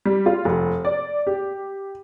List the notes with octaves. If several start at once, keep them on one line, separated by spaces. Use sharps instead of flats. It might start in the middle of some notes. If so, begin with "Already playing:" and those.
G3
F4
F1
D5
G4